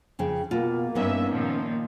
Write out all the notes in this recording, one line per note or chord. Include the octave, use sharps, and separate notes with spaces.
F2 C#3 G5
B2 A#3 F4
G2 B3 C#4 D#4 E5
A#2 D#3 F3